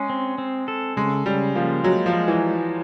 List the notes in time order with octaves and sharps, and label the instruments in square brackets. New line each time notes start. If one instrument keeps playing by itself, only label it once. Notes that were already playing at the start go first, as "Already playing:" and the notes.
Already playing: [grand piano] G#3 [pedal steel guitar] C#4
[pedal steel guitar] C4
C4
A4
[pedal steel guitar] C#3 [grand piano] G#3
[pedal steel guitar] C#3 [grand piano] G3
[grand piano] F3 [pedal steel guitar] A#3
[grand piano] F#3 [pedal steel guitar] G#3
[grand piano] F3
[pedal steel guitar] G#3
[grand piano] E3